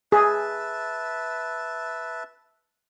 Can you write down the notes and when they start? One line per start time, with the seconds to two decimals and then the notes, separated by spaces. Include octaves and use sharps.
0.12 G#4 B4 E5 A5